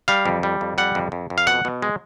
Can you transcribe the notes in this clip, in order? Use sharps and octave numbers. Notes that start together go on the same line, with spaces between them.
G3 F5
F2
G3
F2
G3 F#5
F2
F2
F2
F5
B2 F#5
B2
G#3